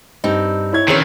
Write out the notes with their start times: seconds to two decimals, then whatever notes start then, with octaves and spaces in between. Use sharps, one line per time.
0.24 G2 C4 D#4
0.73 E4 C#5 G#6
0.88 D#3 E3 C4 C#4 G#4 C#5 G#6